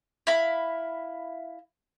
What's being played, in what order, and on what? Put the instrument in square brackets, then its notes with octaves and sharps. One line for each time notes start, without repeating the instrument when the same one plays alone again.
[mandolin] E4 F5 B5